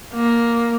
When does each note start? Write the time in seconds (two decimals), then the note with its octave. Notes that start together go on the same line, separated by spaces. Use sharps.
0.14 A#3